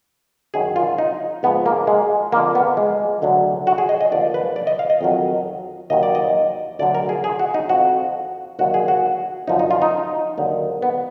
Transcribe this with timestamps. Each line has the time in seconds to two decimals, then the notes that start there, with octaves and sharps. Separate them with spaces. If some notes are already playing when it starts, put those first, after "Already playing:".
0.54 F#2 D#3 F#3 G#4
0.76 F4
0.98 D#4
1.43 G#2 B3
1.47 F3
1.66 A#3
1.87 G#3
2.32 F2 D3 F3 A#3
2.55 B3
2.77 G#3
3.22 D2 D3 F#3
3.67 F#4
3.78 G#4
3.89 D#5
4.01 D#5
4.12 D#2 D3 F3 D5
4.34 B4
4.56 D5
4.67 D#5
4.79 F5
4.90 D#5
5.01 F2 D#3 F#3
5.90 D#2 D#3 F#3 D#5
6.03 D5
6.15 D#5
6.79 D2 D3 F#3 D5
6.95 A#4
7.09 G#4
7.24 G#4
7.39 F#4
7.54 D#4
7.69 F2 F3 F#4
8.59 D#2 D3 F#3 F#4
8.74 G#4
8.88 F#4
9.47 F#2 D3 F3 D#4
9.59 D#4
9.71 F4
9.82 D#4
10.38 D#2 D3 F#3
10.82 B3